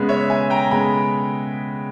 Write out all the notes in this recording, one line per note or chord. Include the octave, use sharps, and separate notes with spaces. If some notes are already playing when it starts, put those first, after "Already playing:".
Already playing: C#3 G#3 B3
C#5 E5
E5 G#5
G5 A#5
A#5
C#3 G#3 B3 G#5 B5